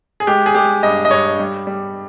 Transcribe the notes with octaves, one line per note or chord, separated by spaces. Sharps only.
G#4
G#3 G4
G#4
G#3 G4
G2 D#5
D#5
G2 C#5
G3
G3